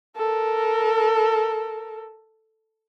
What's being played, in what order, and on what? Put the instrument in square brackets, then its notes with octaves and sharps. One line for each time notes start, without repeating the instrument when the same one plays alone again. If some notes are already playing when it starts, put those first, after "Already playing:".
[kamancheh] A4 A#4